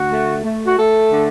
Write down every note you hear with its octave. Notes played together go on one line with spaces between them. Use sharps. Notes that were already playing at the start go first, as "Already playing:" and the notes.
Already playing: D2 F#4
A3
A3
F#4
A3 A4
D3